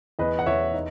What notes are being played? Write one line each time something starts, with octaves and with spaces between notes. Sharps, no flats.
E2 B4 D#5
F#5
E2 C#5 E5
D#4